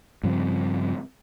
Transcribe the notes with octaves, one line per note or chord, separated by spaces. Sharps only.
G2 C#3 F3 C4